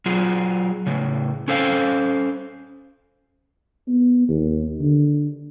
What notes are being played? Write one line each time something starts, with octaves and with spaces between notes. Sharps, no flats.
F#3 F4 G#4
A2 C#3
C#4 A4 C5 F5
B3
D#2
D3